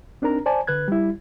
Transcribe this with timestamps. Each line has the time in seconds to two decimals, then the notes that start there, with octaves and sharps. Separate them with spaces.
0.22 C4 D4 D#4 A#4 A#5
0.46 C5 D5 G#5 A5
0.67 D3 B4 F#6 G#6
0.88 G3 E4